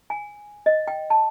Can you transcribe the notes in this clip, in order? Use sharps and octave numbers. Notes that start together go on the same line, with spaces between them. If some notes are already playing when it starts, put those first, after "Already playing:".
G#5
D#5
G5
A5